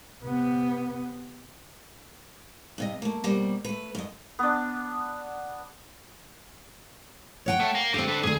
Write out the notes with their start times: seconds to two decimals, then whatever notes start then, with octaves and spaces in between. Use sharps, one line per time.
0.22 C3 B3
2.78 G2 C3 D#5
3.02 A3 A#3
3.24 B2 G3 A#3 C5
3.65 A3 B4
3.95 F#2 D#5
4.39 B3 D4
7.46 C#5 F#5 G5
7.60 A3
7.75 A#4 F5
7.94 D3 C4 G4 F5
8.08 D4 B4
8.23 D2 G#2 G#4